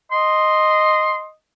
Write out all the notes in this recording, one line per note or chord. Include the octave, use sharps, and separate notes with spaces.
D#5 C6